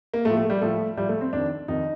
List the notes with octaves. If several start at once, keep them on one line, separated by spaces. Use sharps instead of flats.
A#3
A2 F3 A3
A3
G3
A2 F3 A3
A2 F3 G3
A3
C4
F2 D#3 D4
F2 D#3 D#4